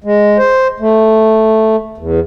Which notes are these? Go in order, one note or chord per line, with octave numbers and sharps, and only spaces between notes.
G#3
C5
A3
E2